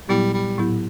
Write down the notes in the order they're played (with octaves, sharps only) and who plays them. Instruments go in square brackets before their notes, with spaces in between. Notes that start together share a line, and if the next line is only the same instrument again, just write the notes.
[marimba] A#2 F#3 B3 E4 [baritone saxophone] G3
[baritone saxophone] G3
[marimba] A2 F#3 B3 E4 G4